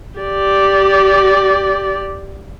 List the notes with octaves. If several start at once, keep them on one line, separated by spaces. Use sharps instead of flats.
G4 D5